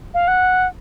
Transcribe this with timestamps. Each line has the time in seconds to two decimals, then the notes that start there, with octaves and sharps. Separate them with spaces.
0.14 F5
0.28 F#5